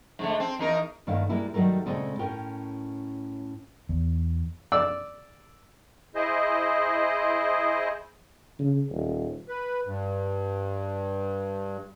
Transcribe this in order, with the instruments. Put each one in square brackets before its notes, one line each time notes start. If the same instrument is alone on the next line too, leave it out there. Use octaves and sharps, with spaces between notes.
[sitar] G#2 D3 A3
C4
E2 D#4 A#4
[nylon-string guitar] G2 D#3 A3 A#3 F5
G3 G#3 A#3 E4
D#3 F#3 G3 A3 A#4
A#2 C#3 G#3 A3 C4 A4
A2 C#4 A#4 G5
[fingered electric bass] E2
[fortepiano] D5 E6
[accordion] E4 G#4 C5 D#5
[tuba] C#3
D#1
[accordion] B4
G2